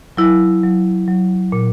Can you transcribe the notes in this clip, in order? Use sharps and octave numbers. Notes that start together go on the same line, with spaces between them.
F#3 E4
F#3
F#3
A#2